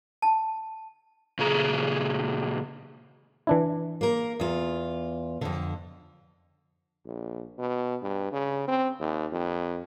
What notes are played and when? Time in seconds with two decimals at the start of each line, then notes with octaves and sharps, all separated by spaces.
0.22 A5
1.39 A#2 C#3 G#4 A#5
3.47 E3 D4 E4
4.01 A#3 A#4
4.40 E2 F4
5.41 F2 D3
7.06 A#1
7.58 B2
8.02 G2
8.32 C#3
8.68 C4
8.99 D#2
9.32 F2